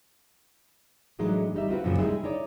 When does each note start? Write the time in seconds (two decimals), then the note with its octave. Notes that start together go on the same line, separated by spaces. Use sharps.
1.19 A2 E3 F#3 G#3 D4 D#4
1.54 G3 D#4 E5
1.69 C4 F4 F#4 B4
1.84 F#2 A#2 C#3 F3
1.98 G3 G#3 D#4 E4 G4 G#4
2.23 D#4 E4 C#5 D5